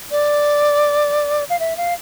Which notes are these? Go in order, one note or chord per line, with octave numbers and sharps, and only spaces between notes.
D5
F5
E5
F5